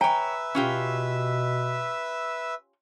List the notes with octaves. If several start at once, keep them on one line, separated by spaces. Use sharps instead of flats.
B4 C#5 E5 G5 G#5 A#5 E6
B2 C#4 F4 G4